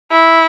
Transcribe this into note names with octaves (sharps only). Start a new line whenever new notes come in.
E4